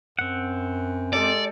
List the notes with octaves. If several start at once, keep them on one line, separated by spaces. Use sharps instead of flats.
F#2 C4 F#5
G#3 G4 A4 D5